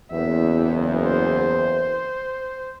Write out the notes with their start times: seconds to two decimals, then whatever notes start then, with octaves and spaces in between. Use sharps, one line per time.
0.12 F#1 E2 E5
1.04 C5